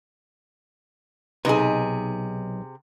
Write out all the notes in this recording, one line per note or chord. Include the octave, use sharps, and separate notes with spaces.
B1 C3 D#4 G#4 B4